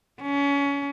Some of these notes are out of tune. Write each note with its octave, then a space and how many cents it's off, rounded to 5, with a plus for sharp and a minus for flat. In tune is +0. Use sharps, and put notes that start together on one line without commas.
C#4 +30